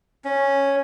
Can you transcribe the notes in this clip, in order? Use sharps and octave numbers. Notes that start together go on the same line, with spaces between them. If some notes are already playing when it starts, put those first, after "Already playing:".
C#4